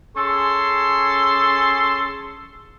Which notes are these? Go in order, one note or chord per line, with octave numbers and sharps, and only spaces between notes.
C#4 G#4 A4 C6